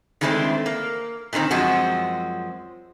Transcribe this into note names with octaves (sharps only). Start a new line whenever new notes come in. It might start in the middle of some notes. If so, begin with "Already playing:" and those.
D#3 E3 G#3 A3 C4 D4
A#3
A#2 D3 D#3 C4
F#2 F3 G#3 C4 F#4